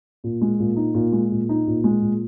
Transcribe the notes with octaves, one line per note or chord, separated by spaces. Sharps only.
A#2
G#3
A#2
D#4
A#2
G#3
A#2
D#4
A#2
G#3
A#2